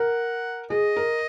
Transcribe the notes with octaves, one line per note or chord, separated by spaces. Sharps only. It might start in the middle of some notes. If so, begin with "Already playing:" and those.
Already playing: A#4 F#5
G#4 D#5
A#4